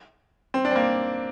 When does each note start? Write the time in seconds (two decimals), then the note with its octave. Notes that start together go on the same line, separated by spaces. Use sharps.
0.54 C4
0.65 D4
0.71 C4
0.76 A#3